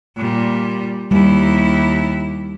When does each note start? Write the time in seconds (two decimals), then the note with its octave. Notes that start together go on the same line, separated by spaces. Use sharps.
0.17 A#2 G3
1.11 D#2 G3 E4